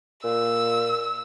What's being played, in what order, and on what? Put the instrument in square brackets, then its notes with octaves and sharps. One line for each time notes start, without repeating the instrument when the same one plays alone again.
[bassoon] A#2 [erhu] E6